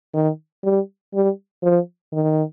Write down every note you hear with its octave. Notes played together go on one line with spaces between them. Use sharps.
D#3
G3
G3
F3
D#3